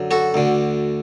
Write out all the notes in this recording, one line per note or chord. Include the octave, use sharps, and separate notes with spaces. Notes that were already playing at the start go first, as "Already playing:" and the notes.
Already playing: F#2 D3
F#4 A4
D2 D3